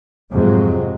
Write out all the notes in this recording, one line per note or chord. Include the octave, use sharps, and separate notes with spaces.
F2 G#2 C3 F#3 G#3